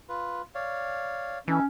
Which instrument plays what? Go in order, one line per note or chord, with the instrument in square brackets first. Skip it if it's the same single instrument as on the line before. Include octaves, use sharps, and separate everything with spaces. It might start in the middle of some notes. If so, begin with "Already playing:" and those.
[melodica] F4 B4
C#5 D5 F5
[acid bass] E3 [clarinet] C#4 [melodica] D#4 A4 E5